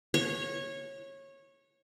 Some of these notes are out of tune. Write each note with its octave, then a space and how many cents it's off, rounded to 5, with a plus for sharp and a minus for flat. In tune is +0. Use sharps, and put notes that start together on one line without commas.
C#5 -20